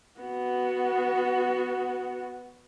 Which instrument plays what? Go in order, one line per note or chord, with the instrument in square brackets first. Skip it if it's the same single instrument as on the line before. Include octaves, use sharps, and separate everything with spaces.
[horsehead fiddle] B3 F#4